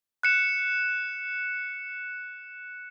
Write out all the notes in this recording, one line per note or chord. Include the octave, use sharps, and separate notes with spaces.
F#6 C#7 E7